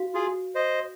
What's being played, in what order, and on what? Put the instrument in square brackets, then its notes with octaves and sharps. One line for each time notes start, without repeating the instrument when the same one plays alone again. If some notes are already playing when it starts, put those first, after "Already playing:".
Already playing: [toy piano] F#4 F5
[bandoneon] F4 G#4
C5 D#5